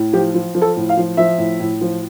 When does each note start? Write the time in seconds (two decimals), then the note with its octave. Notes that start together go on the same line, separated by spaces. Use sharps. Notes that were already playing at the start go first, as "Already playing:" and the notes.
Already playing: A2
0.13 F3 G4
0.34 F3
0.55 F3
0.62 A4
0.76 A2
0.89 F5
0.97 F3
1.17 F3 E5
1.38 A2
1.60 A2
1.81 F3